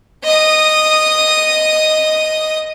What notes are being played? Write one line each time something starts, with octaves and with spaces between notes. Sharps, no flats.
D#5 D#6